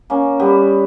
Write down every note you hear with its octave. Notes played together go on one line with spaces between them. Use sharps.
A#3 C#4
G3 B3